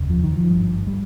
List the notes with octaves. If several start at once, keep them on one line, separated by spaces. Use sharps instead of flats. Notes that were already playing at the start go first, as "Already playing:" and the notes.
Already playing: F1 D#2 C#3
F3
D#3
F3
G#1 G2
G3